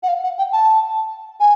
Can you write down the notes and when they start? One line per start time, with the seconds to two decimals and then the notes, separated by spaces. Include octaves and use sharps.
0.03 F#5
0.08 F5
0.23 F#5
0.38 G5
0.52 A5
1.40 G#5